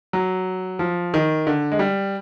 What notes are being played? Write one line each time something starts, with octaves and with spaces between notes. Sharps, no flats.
F#3
F3
D#3
D3
G#3
G3